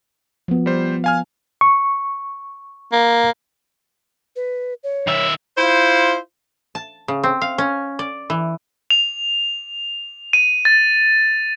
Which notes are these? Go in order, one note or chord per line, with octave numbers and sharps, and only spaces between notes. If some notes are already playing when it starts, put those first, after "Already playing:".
F3 B3
G3 C5
F5 G#5 F6
C#6
A#3
B4
C#5
D#3 E5
E4 F4 C5
A5
C#3
C4
F5
C#4
D5
E3
F7
D#7
A6